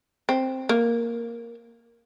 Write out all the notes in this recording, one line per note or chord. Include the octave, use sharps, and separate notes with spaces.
C4
A#3